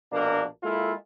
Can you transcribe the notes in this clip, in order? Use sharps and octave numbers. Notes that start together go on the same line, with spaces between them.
A#1 B2 A#3 D4 A#4
G#3 A#3 E4 F4 A4